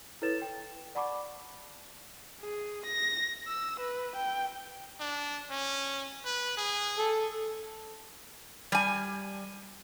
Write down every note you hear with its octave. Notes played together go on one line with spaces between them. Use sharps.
E4 A4 B4 C#5 A6 E7
G5
D5 F#5 A5 B5 C#6 D6
G#4
A#6
E6
B4
G5
D4
C#4
B4
G#4
A4
G3 G#5